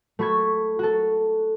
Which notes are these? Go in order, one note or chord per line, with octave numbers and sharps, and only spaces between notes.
A3 F#4 B5 C#6 G#6
F#4 A4